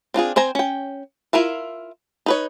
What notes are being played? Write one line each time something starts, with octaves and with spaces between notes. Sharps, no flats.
C4 D4 F4 G#4
C4 C5 G#5 A#5
C#4 G5
E4 F4 A#4 E5 F5
D#4 B4 C#5